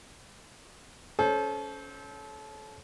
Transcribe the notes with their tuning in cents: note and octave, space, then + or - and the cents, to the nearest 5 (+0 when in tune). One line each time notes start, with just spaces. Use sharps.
C#4 +10 A4 -30 C5 +0